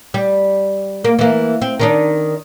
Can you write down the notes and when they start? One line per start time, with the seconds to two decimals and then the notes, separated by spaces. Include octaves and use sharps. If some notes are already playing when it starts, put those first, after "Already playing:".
0.14 G3
1.04 A#3
1.19 E3 A#3
1.62 C4
1.79 D#3 D4 D#4